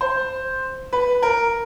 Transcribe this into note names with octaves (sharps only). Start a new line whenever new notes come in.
C5
B4
A#4